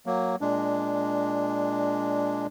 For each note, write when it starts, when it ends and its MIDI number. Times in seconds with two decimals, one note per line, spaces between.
0.06 0.36 54
0.06 0.36 58
0.41 2.47 46
0.41 2.47 56
0.41 2.47 62